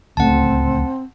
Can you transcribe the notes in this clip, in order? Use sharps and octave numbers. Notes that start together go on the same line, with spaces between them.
D1 C#2 A3 C4 F#5 A5